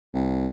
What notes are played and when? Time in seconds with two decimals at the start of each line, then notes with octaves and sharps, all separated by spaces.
0.14 C2